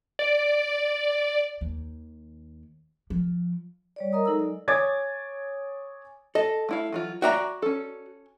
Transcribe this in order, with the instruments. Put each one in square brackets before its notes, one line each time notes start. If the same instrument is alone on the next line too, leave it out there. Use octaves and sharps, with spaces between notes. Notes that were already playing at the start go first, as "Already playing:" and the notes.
[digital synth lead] D5
[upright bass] D#2
F3
[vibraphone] G3 C#5 D5
A#4 D#5 A#5 D#6
F#3 G#3 D#4 A4 D#5 E6
D5
[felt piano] C#5 G#5 D6 D#6 G#6 A6
[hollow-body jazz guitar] A4 [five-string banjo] D#5
[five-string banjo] A3 E4 F5
E3 F#3 F4
[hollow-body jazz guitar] F#4 D5 A#5 [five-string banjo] E5 G5
[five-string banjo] C#4 A4